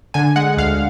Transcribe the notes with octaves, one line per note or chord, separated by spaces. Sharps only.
D3 G#5
G#3 F#5
D2 F5